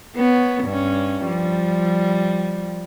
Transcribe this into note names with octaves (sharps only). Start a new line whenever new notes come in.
B3 C#5
G2 C#4
F3 G3